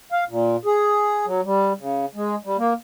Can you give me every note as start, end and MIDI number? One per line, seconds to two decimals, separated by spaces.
0.12 0.24 77
0.29 0.56 46
0.65 1.26 68
1.26 1.41 54
1.45 1.73 55
1.79 2.06 49
2.15 2.35 56
2.45 2.57 55
2.58 2.73 58